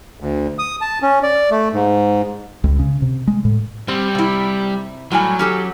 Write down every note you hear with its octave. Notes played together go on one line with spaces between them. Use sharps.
D2
D#6
A5
C#4
D5
A3
G#2
C#2
C#3
C3
G#3
A2
G3 C4
C3 E4
A2 F#3 G3 G#5
C#4 G4 A4